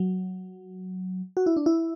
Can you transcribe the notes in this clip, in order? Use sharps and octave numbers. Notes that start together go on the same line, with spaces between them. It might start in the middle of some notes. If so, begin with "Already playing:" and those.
Already playing: F#3
F#4
E4
D4
E4